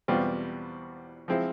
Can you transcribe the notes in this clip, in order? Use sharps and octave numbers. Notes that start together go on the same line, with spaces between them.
E2 B2 G3 C4 F4
F3 G#3 C4 E4